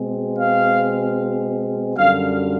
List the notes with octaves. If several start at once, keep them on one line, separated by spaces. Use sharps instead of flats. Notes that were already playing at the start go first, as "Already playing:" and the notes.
Already playing: B2 G#3 C4
F5
F#2 D3 G3 F5